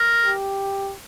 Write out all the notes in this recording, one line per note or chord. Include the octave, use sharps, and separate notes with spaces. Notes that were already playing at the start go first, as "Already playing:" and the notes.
Already playing: A#4
G4